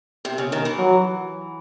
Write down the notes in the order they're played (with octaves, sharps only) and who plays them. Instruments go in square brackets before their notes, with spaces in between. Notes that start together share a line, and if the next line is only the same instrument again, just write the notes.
[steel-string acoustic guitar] C3
C#3
D#3
E3
[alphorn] F#3